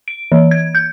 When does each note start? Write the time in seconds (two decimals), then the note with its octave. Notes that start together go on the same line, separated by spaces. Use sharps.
0.08 D7
0.32 E3
0.51 G#6
0.75 G6